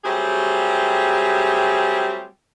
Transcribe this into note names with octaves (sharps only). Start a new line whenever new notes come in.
F#3 G3 A3 C4 G4 G#4